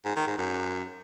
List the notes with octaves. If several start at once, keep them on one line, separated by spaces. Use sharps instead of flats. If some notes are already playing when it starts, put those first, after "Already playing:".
G#2
D#3
G#2
F#2